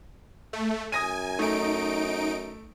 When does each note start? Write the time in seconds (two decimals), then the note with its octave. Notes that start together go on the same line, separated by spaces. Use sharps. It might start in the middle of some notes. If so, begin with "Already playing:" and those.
0.53 A3
0.92 F#2 G#5 D#6 A#6 D#7
1.39 A3 D#4 D7